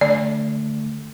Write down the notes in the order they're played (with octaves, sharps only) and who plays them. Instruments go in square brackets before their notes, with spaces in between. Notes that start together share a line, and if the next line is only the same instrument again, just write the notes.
[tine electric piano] D3 A3 [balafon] D5